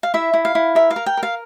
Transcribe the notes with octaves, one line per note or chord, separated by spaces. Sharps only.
F5
E4 E5
E4
F5
E4
A#4 E5
F5
A#4
G5
A#4
F5